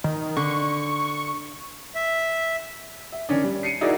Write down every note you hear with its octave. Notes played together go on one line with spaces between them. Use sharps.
D#3
D3 C#6
E5
E5
D#3 C#4 D4
G3
C7 C#7 D#7
D#4 E4 F#4 G#4 A#4 D5